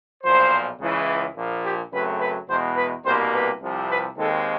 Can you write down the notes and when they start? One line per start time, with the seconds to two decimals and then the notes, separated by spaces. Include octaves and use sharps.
0.24 B1 A#2 F3 C5
0.80 C#2 C#3 E3
1.36 A#1 A#2 F3
1.64 G4
1.92 F#2 C#3 F#3 A3 C4 B4
2.20 B4
2.48 E2 B2 G#3 C5
2.77 B4
3.04 C2 B2 G3 A#3 C5
3.33 B4
3.61 C2 C3 F3
3.89 B4
4.17 D#2 D#3 G#3 C4 A4